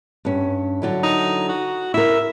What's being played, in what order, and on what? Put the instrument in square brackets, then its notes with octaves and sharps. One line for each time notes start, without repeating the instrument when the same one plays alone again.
[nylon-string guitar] G2 C#4
D3 F#3 E4
[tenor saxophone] D#4
F#4
[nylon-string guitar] E4 A#4 [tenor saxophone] E5